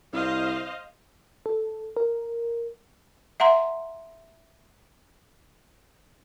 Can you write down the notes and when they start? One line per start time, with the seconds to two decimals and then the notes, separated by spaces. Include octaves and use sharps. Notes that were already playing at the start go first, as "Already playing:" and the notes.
0.13 C2 C5 D#5 F5
1.46 A4
1.97 A#4
3.40 E5 F#5 A#5 C6